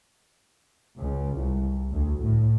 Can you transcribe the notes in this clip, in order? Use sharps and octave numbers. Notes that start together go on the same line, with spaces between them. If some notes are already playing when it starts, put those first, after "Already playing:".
C#2
C2
D2
A2